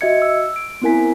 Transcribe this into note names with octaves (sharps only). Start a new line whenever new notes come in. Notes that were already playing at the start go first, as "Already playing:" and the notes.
F#4 D#5 E5 G#6 C#7
E6
D7
B3 C4 E4 A#4 G#5 B6